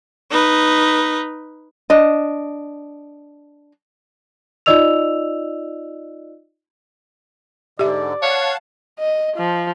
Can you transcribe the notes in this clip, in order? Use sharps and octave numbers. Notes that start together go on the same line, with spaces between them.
D#4 B4
D4 D#5
D#4 F4 D5 D#5 E6 F7
G#2 D3 G4 D5 E5
C#5 F5 F#5 A5
D#5
F3